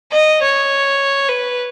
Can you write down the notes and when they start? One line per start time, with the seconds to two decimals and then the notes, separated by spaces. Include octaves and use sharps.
0.12 D#5
0.42 C#5
1.29 B4